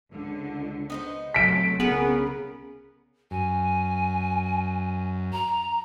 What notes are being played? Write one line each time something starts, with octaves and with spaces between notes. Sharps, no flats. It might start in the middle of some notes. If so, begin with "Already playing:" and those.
C#2 D3
B3 D#4 C5
C3 F#3 A3 B6 D7
C2 C#3 B3 C#4 G#4 A#4
F#2 G#5
A#5